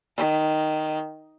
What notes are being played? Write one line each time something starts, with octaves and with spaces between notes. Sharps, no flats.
D#3